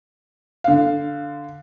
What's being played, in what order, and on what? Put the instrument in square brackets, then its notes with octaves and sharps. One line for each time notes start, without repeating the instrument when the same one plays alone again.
[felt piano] D3 F5